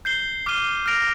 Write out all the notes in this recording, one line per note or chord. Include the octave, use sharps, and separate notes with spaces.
G6 C7 G7
D6 F6 C7 D#7 G7
F6 A#6 D7 F7